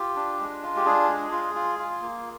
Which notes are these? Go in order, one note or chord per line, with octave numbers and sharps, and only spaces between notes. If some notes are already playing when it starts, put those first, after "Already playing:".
Already playing: F4 G4
D4
G#3
F4
G4
D4 G#4
G#3
F4
F4
F4
A#3